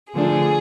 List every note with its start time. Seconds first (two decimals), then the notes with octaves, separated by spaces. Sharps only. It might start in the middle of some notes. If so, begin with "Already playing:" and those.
0.13 D3 F3 A3 D4 G#4